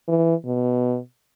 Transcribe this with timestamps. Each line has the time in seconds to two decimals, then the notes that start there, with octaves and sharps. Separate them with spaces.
0.08 E3
0.45 B2